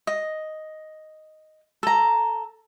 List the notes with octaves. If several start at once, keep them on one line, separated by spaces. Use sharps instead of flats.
D#5
A4 A#5